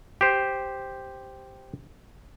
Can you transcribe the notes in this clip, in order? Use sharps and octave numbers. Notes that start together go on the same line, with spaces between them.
G4 C5